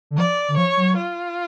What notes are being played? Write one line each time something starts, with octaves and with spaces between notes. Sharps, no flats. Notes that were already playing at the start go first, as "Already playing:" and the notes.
D3
F3 D5
D3
F3 C#5
F#3
F4